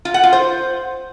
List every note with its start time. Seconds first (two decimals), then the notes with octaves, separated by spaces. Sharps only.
0.05 F4
0.14 F#5
0.23 F4
0.33 C5